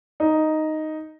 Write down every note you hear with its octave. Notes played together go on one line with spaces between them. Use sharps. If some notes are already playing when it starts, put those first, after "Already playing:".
D#4